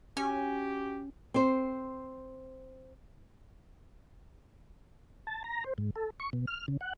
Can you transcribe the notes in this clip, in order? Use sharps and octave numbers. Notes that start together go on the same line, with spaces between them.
C#4 F#4 G4 G#5
C4 C5
A5
A#5
C5
G#2
A4
C#6
B2
F6
C#3
F#5